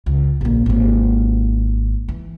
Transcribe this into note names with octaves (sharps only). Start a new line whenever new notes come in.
C#2
A#1 A#3
G#1 A#3
E3